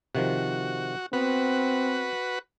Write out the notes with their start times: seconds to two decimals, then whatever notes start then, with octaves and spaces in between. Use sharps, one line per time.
0.15 C3 D#3 F3 F#4
1.13 B3 C4 F#4 B4